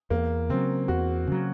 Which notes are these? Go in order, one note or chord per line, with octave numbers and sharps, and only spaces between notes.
E2 A#3
C#3 F#3 C4
E2 F#4
C#3 F#3